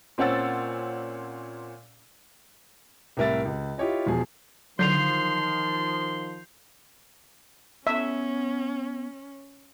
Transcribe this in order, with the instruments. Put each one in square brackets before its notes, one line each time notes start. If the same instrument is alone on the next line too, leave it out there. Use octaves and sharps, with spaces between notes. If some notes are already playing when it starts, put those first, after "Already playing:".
[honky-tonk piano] A#2 C4 C#4 F#5 E6 A6
[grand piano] C2 A2 A#4 E5 A6
C#2
E4 F4 G4 C#5 D#5
E1 F3 G#4
[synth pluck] D3 F#3 [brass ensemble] D#3 F3 [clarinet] C6 [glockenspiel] G6 C7 F7
[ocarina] B3 [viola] C#4 [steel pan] E5